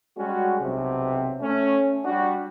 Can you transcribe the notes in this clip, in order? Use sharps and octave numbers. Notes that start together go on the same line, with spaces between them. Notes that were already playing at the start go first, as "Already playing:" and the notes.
G3 G#3 C#4 F#4
B1 C3
A3 C#4
G3 D4 F#4